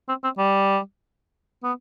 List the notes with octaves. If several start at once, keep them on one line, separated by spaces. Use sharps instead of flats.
C4
C4
G3
B3